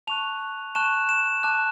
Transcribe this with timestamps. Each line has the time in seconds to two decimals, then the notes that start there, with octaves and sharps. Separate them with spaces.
0.07 A5 C#6 F#6 F7
0.75 A5 C#6 F#6 E7
1.09 E7
1.43 A5 D6 F#6